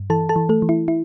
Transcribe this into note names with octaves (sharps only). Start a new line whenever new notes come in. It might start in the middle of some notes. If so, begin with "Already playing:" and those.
Already playing: G2
E3 A4 A5
A4 A5
E3
A3 A4
E3
E4
E4